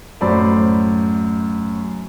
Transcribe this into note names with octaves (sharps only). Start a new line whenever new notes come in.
F#2 A2 C5 D5 B5